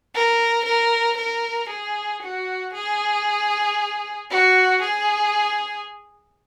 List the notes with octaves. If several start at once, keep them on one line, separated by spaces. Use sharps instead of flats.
A#4
A#4
A#4
G#4
F#4
G#4
F#4
G#4